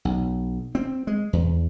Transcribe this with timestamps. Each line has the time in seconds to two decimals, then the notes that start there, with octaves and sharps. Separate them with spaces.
0.05 B1
0.75 C4
1.07 G#3
1.33 E2